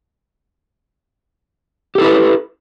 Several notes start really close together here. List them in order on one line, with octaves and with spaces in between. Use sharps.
G4 A4 E4 B4